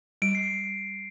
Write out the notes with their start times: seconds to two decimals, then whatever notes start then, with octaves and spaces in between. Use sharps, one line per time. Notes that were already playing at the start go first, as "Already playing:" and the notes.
0.22 G3 D7
0.35 C7